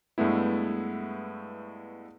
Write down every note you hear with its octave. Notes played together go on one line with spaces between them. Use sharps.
G2 G#3 A3 B3 E4